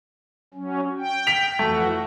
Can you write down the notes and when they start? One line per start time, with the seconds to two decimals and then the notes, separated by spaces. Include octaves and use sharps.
0.54 F#3 C#4
0.98 G5
1.27 B6 F7
1.59 F2 E3 A3 F#4